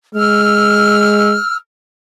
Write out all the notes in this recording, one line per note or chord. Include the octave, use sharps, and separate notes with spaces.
G#3 E6 F6